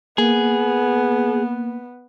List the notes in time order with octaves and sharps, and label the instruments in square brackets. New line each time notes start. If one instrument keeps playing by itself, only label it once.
[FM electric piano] A#3 [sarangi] B3 [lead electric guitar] G#4